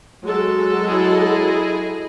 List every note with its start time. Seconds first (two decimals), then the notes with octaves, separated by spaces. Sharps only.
0.23 F#3 G#3 A4
0.85 E4 G#4 D#5